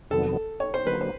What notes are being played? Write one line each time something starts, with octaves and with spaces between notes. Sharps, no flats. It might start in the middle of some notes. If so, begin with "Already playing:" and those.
F2 C3 D#3 F#3 B3 A4
C#5
C5
D3 F#3 A#3 B4
C5